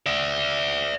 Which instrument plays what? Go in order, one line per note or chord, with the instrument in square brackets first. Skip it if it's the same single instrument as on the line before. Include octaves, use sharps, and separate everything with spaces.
[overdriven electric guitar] D5 E5